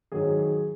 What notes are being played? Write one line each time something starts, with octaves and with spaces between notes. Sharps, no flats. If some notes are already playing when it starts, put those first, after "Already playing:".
G#2 D#3 F#3 G#4
G#4